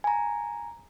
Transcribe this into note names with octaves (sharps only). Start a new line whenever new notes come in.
G#5 A#5